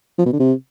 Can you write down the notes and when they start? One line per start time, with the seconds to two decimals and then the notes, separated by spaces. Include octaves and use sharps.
0.18 F3
0.25 B2
0.32 D3
0.39 C3